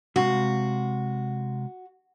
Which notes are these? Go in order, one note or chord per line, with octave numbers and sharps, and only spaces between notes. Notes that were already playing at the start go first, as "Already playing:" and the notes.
C3 G#3 F#4 F5